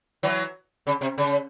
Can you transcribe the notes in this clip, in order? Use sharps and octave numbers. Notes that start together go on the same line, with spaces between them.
E3 F#3
C#3
C3
C#3